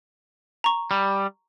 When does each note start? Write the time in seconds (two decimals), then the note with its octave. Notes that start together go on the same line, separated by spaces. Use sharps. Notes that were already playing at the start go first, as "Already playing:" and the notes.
0.64 A#5 C#6
0.91 G3